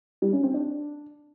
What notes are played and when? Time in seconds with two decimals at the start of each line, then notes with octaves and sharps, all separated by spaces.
0.22 G3
0.33 C#4
0.43 C4
0.54 D4